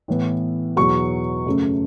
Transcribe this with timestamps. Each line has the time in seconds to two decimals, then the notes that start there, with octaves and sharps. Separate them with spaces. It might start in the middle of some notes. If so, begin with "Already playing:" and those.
0.08 A2 E3 B3
0.76 E2 B2 F#3 C#6
1.46 F#2 C#3 A3